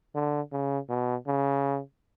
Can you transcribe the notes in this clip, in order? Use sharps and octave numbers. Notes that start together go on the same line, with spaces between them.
D3
C#3
B2
C#3